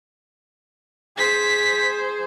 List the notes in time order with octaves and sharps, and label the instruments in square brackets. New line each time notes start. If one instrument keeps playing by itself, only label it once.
[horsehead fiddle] G#4 C5 [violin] B6